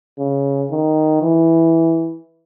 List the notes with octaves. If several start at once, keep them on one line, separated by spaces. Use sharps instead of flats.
C#3
D#3
E3